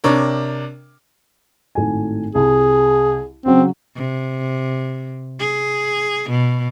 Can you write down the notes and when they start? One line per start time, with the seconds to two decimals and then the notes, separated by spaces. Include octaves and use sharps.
0.04 C3 D4 A#4 C#5
1.75 G#1 A2 G#5
2.35 C2 G#4
3.46 C#3 F#3 C4
3.96 C3
5.39 G#4
6.30 B2